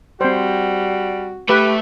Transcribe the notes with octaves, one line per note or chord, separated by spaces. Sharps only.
G3 C4 F#4 C5
A3 G4 B4 E5